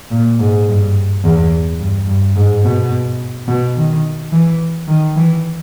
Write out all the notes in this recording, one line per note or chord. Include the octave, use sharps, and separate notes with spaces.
A#2
G#2
G2
E2
G2
G2
G#2
B2
B2
D#3
E3
D#3
E3